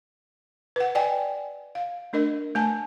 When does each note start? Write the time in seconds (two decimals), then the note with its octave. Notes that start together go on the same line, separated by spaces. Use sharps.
0.76 B4 F#5
0.95 D5 D#5 G5 G#5
1.75 F5
2.13 A3 D4 A#4 D#5
2.55 A3 G#5 A5